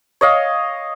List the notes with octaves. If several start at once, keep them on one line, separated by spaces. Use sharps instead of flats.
C#5 D#5 F5